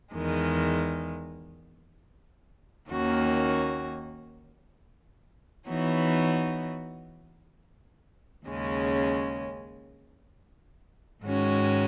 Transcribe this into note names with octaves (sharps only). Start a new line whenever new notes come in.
E2 D#3 G#3
D#2 D#3 A#3 C#4 F#4
E3 B3 D#4 F#4 C#5
D#2 C#3 G#3 C#4
G#2 D#3 G#3 C#4 F#4